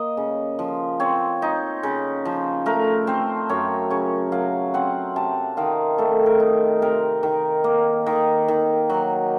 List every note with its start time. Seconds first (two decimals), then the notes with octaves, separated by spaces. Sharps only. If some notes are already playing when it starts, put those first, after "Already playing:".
Already playing: A#3 D#5
0.17 C#3
0.59 F3
1.00 C4 C#5
1.42 D#4
1.83 C#3
2.25 F3
2.66 A3 A#4
3.07 C4 C5
3.49 F#2 C#5
3.90 C#3 C#5
4.32 F#3 F5
4.74 C4 F#5
5.16 C3 A5
5.57 D#3 F5
5.98 A3 A4
6.26 A#4
6.40 D#4
6.82 C3 A#4
7.23 D#3
7.64 A#3
8.06 D#3
8.48 D#3
8.90 F#3